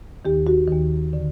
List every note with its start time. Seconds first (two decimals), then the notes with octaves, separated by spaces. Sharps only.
0.25 D#2 D#3 G4
0.47 F#4
0.67 D#2 D#3
1.13 D3